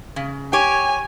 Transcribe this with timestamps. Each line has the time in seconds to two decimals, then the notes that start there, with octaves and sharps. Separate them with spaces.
0.16 C#3
0.53 G4 C#5 G#5